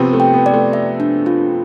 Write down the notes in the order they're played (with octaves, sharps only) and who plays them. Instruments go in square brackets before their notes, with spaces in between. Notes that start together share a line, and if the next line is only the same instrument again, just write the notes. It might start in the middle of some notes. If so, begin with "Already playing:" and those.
Already playing: [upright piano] C3 F3 B3 C4 [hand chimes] G4
[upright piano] A3
[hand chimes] G5
[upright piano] B3
[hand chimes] D5
[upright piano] A3
[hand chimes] E5
D4
F4